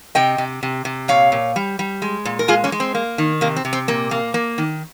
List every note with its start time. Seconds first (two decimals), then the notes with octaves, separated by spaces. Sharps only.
0.15 C3 D#5 G5
0.38 C3
0.63 C3
0.85 C3
1.08 A#2 C#5 F5
1.32 A#2
1.56 G3
1.79 G3
2.02 G#3
2.25 A#2
2.39 A#4
2.48 G#3 F4 G#4
2.64 A#3 C#4
2.72 G#3
2.80 C4
2.95 A#3
3.18 D#3
3.41 C3 A#3
3.56 C4
3.65 C3
3.73 C4
3.88 A#2 A#3
4.11 A#3
4.34 A#3
4.58 D#3